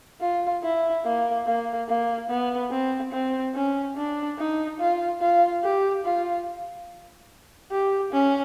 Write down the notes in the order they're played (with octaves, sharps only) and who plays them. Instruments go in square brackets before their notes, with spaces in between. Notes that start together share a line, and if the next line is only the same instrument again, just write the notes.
[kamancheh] F4
E4
A#3
A#3
A#3
B3
C4
C4
C#4
D4
D#4
F4
F4
G4
F4
G4
C#4